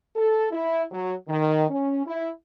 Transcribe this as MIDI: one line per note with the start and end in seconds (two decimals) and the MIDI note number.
0.15 0.47 69
0.51 0.83 64
0.91 1.14 54
1.28 1.65 51
1.70 2.04 61
2.06 2.29 64